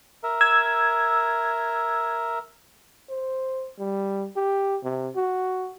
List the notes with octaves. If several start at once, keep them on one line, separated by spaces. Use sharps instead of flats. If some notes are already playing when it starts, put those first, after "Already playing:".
A#4 E5
E6 G#6
C5
G3
G4
C3
F#4